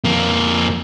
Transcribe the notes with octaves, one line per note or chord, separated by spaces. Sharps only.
F2 A#3